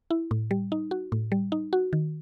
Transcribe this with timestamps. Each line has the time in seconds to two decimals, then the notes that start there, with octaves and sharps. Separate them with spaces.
0.10 E4
0.31 A2
0.51 G3
0.72 D#4
0.91 F#4
1.12 A2
1.32 G3
1.52 D#4
1.73 F#4
1.93 D#3